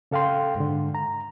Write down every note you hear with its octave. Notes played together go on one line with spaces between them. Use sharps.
C#3 A4 F5 G5 C6
G#2 D3
A#5